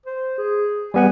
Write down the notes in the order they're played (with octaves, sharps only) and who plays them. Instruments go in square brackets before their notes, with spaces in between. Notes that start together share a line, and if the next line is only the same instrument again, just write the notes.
[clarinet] C5
G#4
[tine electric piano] G3 B3 F#5 [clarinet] G#5